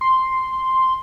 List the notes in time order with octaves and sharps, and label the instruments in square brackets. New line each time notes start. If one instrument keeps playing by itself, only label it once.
[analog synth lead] C6